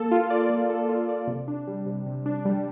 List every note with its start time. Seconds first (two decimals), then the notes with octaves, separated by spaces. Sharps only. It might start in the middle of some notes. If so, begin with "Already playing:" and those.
Already playing: A#3 A4
0.11 F4
0.30 D5
0.50 A#3
0.70 A4
0.89 F4
1.09 D5
1.27 C3
1.48 D4
1.67 G3
1.86 C3
2.06 C3
2.26 D4
2.45 G3